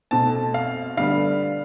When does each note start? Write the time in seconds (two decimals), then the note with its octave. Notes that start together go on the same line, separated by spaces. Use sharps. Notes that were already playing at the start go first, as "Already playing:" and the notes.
0.11 B2 A3 C4 A5
0.54 F5
0.97 D3 G3 B3 F5